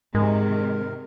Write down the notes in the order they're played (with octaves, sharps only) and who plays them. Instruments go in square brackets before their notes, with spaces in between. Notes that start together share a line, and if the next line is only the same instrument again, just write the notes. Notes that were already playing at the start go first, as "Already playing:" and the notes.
[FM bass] G#2 [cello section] C3 D#3 [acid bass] G#3 [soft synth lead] A#4